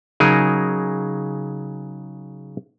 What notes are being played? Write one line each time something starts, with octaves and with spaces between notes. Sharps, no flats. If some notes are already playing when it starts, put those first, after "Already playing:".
C#3 F#3 D#4 G#4 A#4